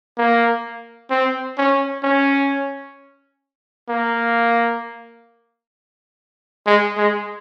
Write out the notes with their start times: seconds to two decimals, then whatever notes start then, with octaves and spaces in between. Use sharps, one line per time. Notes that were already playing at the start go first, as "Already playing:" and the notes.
0.18 A#3
1.10 C4
1.58 C#4
2.03 C#4
3.89 A#3
6.67 G#3
6.98 G#3